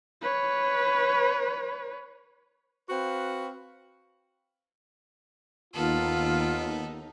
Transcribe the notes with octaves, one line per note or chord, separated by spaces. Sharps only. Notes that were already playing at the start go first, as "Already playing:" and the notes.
B4 C#5
C4 F#4 B4 F5
D#2 B3 D#4 F4 A4